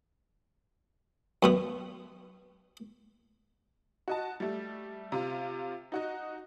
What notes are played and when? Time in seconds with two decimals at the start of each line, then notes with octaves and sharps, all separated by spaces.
1.43 F#2 B2 B3
4.08 F#4 D#5 A5
4.40 G3 A3
5.12 C3 F4
5.92 D#4 F#4 D#5